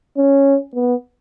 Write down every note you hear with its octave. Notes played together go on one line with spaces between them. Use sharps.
C#4
B3